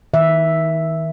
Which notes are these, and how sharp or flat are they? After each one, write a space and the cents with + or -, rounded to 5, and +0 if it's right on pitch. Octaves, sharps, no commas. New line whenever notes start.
D#3 +35 E5 +0